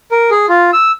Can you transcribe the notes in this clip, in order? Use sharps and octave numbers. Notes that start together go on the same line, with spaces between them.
A#4
G#4
F4
E6